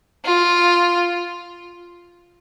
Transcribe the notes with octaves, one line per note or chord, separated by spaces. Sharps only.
F4